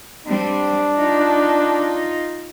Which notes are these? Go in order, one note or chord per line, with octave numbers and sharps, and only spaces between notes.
G3 C4 D4
D#4 F4